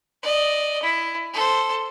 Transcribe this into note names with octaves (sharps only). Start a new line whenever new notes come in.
D5 D#5
E4
A4 C5